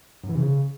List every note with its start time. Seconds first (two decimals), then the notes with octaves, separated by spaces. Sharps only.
0.23 F#2
0.29 E3
0.35 C3
0.41 C#3